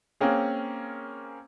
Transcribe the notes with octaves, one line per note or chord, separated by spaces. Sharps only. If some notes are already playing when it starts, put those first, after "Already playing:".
A#3 C4 C#4 G#4